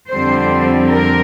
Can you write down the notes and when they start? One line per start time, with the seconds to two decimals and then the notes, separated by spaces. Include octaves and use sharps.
0.11 F2 D3 G3 C4 C5
0.89 A#4